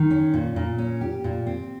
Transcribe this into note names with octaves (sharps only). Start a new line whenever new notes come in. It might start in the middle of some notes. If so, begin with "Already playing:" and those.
Already playing: D#3
C#4
A#2
A#2
C#4
G4
A#2
C4